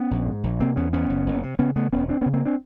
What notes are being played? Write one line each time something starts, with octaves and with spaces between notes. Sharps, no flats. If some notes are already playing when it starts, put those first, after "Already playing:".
Already playing: B3 C#4
A#1
G#2
A#1
C3 A#3 C4
E2 B3 C#4
E2 B3 C#4
F#1
F#1
C3
C#3 B3 C#4
C#3 A3 B3
E1 B3 C#4
D2 C4 D4
B3 C#4
C#3
A#3 C4
C4 D4